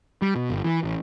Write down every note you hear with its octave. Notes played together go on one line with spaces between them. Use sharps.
G3
B2
G1
E3
A1